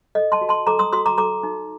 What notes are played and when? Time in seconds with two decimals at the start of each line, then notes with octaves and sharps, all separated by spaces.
0.15 A4 D#5
0.32 A5 C6
0.41 F#4
0.49 A5 C6
0.67 A4 A#5 D6
0.79 C6 D#6
0.93 F#4 C6 D#6
1.06 A#5 D6
1.18 A4 A#5 D6
1.43 D#4